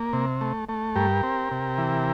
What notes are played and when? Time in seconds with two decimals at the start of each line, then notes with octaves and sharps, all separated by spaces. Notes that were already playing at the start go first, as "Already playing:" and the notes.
Already playing: A#3
0.13 C3
0.41 A3
0.69 A3
0.96 G2 G4 A#4
1.23 C4
1.51 C3
1.78 E3